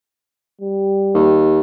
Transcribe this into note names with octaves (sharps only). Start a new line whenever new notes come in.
G3
D#2